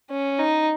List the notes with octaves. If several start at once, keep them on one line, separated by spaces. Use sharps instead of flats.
C#4
D#4